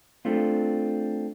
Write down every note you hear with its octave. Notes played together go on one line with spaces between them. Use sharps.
A3 C4 D4 F4